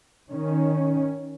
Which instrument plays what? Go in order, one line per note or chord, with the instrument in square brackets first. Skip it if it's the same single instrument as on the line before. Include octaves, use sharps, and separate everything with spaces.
[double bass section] D#3 C#4